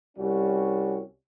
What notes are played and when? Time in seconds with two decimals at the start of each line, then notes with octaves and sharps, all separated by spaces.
0.18 C2 G3 C#4 F#4